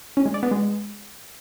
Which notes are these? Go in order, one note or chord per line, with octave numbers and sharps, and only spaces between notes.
C#4
G#3
D5
B3
G#3